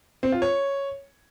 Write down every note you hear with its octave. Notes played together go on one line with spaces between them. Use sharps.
C4
F4
C#5